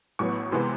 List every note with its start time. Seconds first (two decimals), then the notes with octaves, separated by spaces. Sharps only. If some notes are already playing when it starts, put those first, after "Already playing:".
0.19 A1 A2 F#3 B3 C#6
0.52 C3 E3 G#3 B3 C6